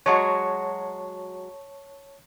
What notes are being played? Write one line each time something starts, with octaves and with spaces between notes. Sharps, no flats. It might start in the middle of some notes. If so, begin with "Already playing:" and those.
F#3 G#3 F#4 C#5 A5 C#6